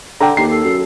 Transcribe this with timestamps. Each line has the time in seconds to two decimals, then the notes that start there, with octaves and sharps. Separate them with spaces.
0.21 D3 G5 A#5
0.37 D#2 G4 C7
0.50 A4
0.64 F#2